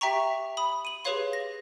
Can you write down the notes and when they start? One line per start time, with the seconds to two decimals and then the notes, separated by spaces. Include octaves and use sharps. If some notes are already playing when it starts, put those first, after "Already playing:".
0.01 G4 E5 G5 A#5 C#6
0.57 B5 D#6
0.85 D#7 F#7
1.05 G4 G#4 B4 C#5 F5 C6
1.33 A#6